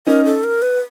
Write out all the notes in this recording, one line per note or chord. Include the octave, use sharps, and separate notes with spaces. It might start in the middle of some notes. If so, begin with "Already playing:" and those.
C#4 D#4 A#4
A4
A#4
B4